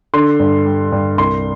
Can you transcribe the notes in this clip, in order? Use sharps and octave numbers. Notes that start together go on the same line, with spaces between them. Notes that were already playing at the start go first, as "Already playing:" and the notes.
D3 C6
G2
G3
G2
C2 C6